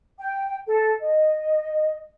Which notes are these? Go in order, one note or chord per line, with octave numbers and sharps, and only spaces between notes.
G5
A4
D#5